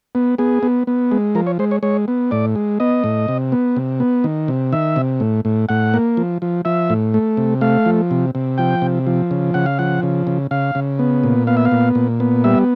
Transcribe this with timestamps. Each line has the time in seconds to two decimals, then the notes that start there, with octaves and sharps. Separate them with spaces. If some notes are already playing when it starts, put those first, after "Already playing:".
0.15 B3
0.38 B3 G#4
0.63 B3
0.87 B3
1.11 G#3
1.35 F3 A#4
1.47 C#5
1.59 G#3 C5
1.71 C#5
1.83 G#3 C#5
2.08 B3
2.31 A2 D5
2.56 G#3
2.80 B3 D#5
3.04 A2
3.28 C3
3.52 B3
3.76 C3
4.00 B3
4.24 D#3
4.48 C3
4.72 D#3 E5
4.96 C3
5.20 A2
5.45 A2
5.69 A2 F#5
5.94 A#3
6.17 F3
6.42 F3
6.65 F3 E5
6.90 A2
7.14 A3
7.37 C3
7.61 A3 F5
7.86 F3
8.11 C3
8.35 C3
8.58 F3 G5
8.82 C3
9.07 F3
9.31 C#3
9.54 C#3 F#5
9.66 F5
9.79 F3 F#5
10.03 C#3
10.27 C#3
10.51 C#3 F5
10.75 C#3
10.99 B3
11.23 A#2
11.47 B3 F5
11.57 E5
11.65 F5
11.72 A#2
11.95 A#2
12.20 B3
12.44 G3 E5